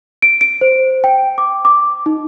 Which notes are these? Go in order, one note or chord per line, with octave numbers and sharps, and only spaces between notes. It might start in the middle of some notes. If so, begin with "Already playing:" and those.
D7
D7
C5
G5
D6
D6
D#4